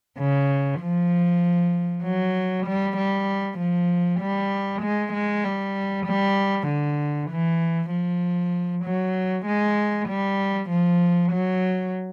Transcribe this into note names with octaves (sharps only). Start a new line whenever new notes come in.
C#3
F3
F#3
G3
G3
F3
G3
G#3
G#3
G3
G3
D3
E3
F3
F#3
G#3
G3
F3
F#3